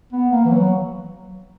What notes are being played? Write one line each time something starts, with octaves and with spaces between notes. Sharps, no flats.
B3
A#3
E3
F#3